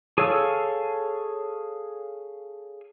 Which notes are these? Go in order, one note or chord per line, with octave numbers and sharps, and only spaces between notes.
G#4 A4 C#5 F5 E6